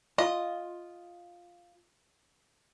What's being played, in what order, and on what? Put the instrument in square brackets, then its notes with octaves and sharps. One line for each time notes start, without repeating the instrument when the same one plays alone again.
[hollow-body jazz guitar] F4 [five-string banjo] D#5